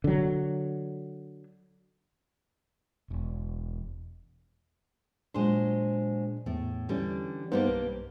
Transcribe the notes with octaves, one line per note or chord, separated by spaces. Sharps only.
D3 F#3
E1
A#2 F#3 G#3 D4 C5
E2 A2
D3 E3 G3 C#4
G2 G3 A#3 B3 D#4 C5
B1